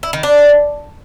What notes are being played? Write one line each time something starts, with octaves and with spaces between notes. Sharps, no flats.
E4
D#3
D4